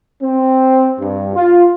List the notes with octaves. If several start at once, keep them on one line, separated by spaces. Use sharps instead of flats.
C4
G2
F4